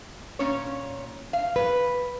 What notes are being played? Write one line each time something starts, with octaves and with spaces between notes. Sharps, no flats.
A#2 C#4 C#5
F5
B4